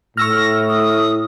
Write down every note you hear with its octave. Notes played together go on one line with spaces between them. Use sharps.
A2 C#6 E6 F6 A#6
D#6